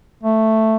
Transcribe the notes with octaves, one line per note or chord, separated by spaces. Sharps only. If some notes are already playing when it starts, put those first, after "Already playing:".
A3